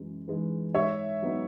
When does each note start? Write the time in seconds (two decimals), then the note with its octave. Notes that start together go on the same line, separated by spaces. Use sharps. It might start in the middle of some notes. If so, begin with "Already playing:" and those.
Already playing: F#2 E3 G#3
0.28 E3 G#3 D#4
0.74 G#2 C#5 E5
1.22 F#3 B3 D#4